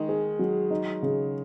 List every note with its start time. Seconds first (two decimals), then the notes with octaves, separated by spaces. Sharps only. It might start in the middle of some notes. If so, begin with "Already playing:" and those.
Already playing: D#3 G#3 D#4
0.09 G#4
0.39 F#3
0.71 D#4
1.02 C#3